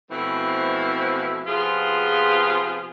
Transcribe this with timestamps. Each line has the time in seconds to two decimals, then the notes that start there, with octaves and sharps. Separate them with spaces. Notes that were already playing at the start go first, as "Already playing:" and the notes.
0.11 B2 E3 F3 A3 C4 E4
1.47 C3 F3 B3 F4 G#4